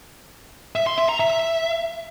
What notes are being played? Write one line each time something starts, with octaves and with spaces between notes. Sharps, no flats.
E5
C6
E5
A#5
E5